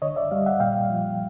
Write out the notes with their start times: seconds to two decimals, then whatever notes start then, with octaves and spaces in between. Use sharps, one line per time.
0.02 D3 C#5 D#5
0.16 D5 E5
0.31 G3 D#5 F5
0.46 E5 F#5
0.60 A#2 F5 G5
0.90 F3